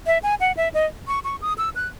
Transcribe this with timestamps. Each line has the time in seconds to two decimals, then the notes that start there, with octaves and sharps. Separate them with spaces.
0.06 E5
0.23 G#5
0.40 F#5
0.57 E5
0.74 D#5
1.08 C#6
1.24 C#6
1.42 D#6
1.58 E6
1.76 F#6